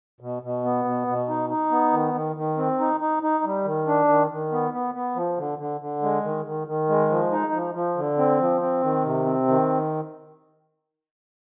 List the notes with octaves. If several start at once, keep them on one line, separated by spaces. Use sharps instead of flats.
B2
B2
B3
B2
B2
D#4
D#4
B3
D#3
D#3
D#3
C4
D#4
D#4
D#4
G3
D#3
D4
D#3
D#3
B3
B3
B3
F3
D3
D3
D3
G#3
D#3
D#3
D#3
G#3
F3
D#4
F3
F3
D3
C4
F3
C4
D#3
C3
C4
D#3